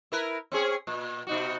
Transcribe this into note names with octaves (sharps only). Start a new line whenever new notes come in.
E4 A#4 B4
C4 C#4 G#4
A#2
B2 D#4 F#4